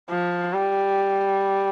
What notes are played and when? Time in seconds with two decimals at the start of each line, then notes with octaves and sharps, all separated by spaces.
0.10 F3
0.53 G3